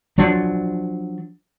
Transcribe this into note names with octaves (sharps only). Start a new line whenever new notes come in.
F3 F#3 D4